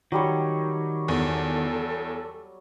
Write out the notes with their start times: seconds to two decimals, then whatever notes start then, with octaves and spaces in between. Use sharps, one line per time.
0.12 D#3 F#3 G3 C#5
1.08 E2 A4